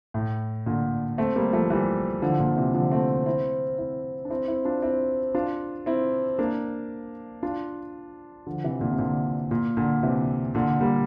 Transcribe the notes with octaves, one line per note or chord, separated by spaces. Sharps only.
A2
A#2 D3
A3 C4
G3 A#3
F3 A3
E3 G3
D3 F3
A#2 D3
C3 E3
D3 F3
A3 C4
C4 E4
C4 E4
D4
C4 E4
C4 E4
D4 F4
C4 E4
D4 F4
C4 E4
A#3 D4
D4 F4
D3 F3
C3 E3
A#2 D3
C3
A#2 D3
A#2
A#2 D3
C3 E3
A#2 D3
G3 A#3